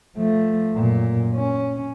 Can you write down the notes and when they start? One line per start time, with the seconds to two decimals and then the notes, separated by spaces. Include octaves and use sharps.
0.17 F3 A3
0.76 F#2 A#2
1.35 C#4